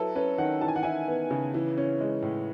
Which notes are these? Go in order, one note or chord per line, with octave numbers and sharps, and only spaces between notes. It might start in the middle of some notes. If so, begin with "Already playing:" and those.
Already playing: F#3 E4 A4 B4
C#4 B4
D#3 F#5
E3 A5
G#5
F#5
E4 G#5
B3
C#3
E3
C#4
G#3
A2